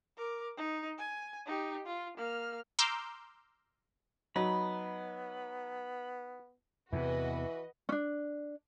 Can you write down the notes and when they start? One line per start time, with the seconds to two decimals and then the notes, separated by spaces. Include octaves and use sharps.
0.17 A#4 D6
0.57 D#4
0.98 G#5
1.45 D#4 G4
1.86 F4
2.17 A#3 F6
2.79 A#5 C6 D6 E6 F6 G6
4.36 F#3 B3 D#4 B5
6.93 E2 C3 E3 F#4 B4 D#5
7.89 C#4 D4